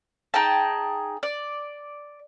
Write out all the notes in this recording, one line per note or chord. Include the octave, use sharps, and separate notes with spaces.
D#4 G#4 G5 A5
D5